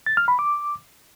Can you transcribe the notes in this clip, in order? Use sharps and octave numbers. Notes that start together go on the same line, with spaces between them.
A6
F6
B5
D6